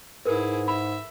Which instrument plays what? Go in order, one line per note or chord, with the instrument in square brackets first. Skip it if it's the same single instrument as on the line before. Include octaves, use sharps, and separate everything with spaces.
[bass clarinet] G#2 [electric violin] E4 G#4 [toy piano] A#4 B4
[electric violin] E5 [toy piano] B5